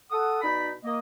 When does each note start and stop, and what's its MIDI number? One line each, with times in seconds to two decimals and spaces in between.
0.10 0.39 69
0.10 0.39 78
0.10 0.39 87
0.42 0.71 47
0.42 0.71 63
0.42 0.71 74
0.42 0.71 83
0.84 0.98 58
0.84 0.98 75